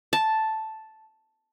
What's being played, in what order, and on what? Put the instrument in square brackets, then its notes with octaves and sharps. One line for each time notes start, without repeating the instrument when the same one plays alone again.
[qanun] A5